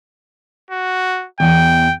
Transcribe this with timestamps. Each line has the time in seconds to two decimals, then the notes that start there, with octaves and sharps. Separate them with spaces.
0.70 F#4
1.40 E2 G5 G#5